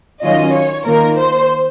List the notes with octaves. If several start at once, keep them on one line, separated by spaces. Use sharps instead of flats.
D#3 F#3 C#4 F4 D#5
C#5
D#3 A#3 F4 A#4
C5